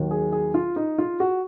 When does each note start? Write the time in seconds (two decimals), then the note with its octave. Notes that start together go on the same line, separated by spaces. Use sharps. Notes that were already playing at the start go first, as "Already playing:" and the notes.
Already playing: D#2 D#3 F#3
0.11 G#4
0.32 G#4
0.54 F4
0.76 D#4
0.98 F4
1.20 F#4